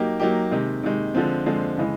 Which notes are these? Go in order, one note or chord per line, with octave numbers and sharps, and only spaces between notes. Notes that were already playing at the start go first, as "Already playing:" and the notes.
Already playing: F#3 A#3 D#4 G4
F#3 A#3 D#4 G4
C3 D#3 G#3
C3 D#3 G#3
D3 F3 G#3 C4
D3 F3 G#3 C4
C#3 E3 G#3